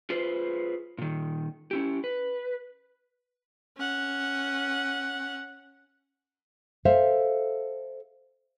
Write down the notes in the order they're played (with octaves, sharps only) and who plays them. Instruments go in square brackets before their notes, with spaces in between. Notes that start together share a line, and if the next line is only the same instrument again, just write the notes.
[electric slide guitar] F4 G#4 B4 C5
A#2 D#3
C#4 E4 G4
B4
[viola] C#4 F#5
[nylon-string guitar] A4 C5 E5 F5